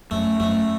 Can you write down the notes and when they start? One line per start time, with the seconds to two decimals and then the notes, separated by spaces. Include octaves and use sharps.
0.11 F#2 A3
0.40 F#2 A3